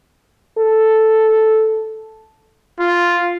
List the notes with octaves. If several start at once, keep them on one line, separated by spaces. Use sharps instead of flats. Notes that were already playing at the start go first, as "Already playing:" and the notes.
A4
F4